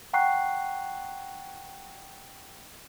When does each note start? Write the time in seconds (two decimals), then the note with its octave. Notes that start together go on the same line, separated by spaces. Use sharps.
0.13 F#5 G5 A#5 C#6 F#6 C7